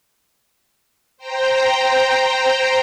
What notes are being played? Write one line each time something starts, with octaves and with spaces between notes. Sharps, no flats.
C5 G5 A#5